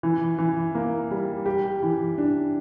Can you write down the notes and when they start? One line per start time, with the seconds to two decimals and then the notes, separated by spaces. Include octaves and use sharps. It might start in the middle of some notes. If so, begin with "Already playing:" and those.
0.03 E3
0.38 E3
0.75 A#3
1.11 G3
1.46 G4
1.83 E3
2.18 D4